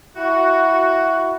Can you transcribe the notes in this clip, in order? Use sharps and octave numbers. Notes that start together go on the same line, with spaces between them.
E4 F#4